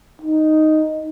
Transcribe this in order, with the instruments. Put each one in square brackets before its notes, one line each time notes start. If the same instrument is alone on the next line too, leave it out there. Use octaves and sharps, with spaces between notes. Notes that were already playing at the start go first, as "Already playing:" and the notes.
[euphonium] D#4